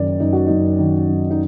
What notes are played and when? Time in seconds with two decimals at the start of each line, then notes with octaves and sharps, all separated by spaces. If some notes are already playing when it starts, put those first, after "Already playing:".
Already playing: F#1 D#3 D5
0.20 F#1 D#4
0.33 F#4
0.47 F#2 D#4
0.79 D#3
1.09 F#1
1.31 D#4